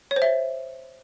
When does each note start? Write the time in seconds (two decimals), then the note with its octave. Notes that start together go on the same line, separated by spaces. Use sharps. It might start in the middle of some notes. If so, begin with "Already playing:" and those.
0.11 C#5
0.16 C5
0.22 E5